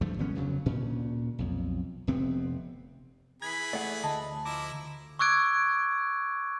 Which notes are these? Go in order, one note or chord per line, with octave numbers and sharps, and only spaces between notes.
D2 G2 F3 A3
G#1 D3 B3 C#4
F1 D2 C#3 F#3
D2 A#2 C#4
B1 F2
F1 C3 B3 C4
E3 G#4 B5 G#6 B6
A3 D5 F#5
D2 D#5 A5
F3 E4 A#5 D6
C#6 D6 E6 F#6 G#6 D7